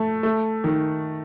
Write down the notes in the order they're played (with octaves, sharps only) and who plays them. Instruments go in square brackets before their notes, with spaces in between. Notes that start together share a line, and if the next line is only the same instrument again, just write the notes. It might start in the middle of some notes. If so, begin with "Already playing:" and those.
Already playing: [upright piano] A3
A3
D#3